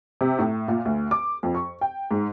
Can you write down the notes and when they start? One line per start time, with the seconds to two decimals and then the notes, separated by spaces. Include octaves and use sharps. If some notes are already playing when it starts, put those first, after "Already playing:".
0.21 C3
0.39 A2
0.68 A#2
0.85 D2
1.11 D6
1.43 F2
1.55 C#6
1.81 G5
2.11 G#2